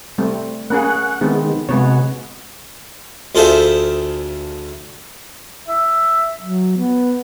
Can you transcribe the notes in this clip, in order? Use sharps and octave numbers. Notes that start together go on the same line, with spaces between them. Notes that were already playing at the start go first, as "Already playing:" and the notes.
G3 A3 C4
A#3 C#4 G#4 F#5
D#3 G#3 B3 C4
C3 G#3 B3 F#4 C#5
D2 F4 G#4 A4 C5 E5
E5
F#3
B3